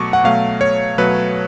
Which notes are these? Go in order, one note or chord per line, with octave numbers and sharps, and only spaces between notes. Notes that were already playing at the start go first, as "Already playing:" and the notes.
Already playing: B2 F#3 A3 C#6 D6
F#5
B2 F#3 A3 F5
C#5
B2 F#3 A3 B4